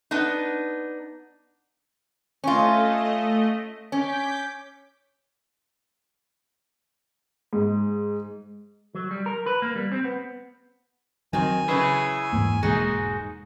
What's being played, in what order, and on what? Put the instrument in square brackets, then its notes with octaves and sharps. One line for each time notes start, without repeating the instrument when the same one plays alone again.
[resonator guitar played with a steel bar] B3 D4 D#4
[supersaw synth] A3 D#5 [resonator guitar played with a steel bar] C#4 F4
[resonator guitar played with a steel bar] C#4 [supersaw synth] D6 G6 B6
[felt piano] G#2
[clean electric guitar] F#3
G3
A#4
B4
A#3
G3
C4
B3
[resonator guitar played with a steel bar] D#3 C4 [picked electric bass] F#3 [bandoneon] G#5
[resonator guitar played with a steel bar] C#3 B4 [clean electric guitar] C#4 E4 G#4
[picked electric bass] E2 G#2 A#3
[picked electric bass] E1 G#3 A#3 [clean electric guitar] G#2 D#4 F#4 [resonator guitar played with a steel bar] G#4